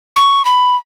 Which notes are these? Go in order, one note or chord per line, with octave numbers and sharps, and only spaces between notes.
C#6
B5